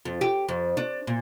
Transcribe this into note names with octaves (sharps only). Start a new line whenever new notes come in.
F2
G4
F2
D4
A#2